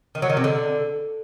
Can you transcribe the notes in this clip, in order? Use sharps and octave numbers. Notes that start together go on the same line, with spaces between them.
D#3
F#3
D#3
C3
D3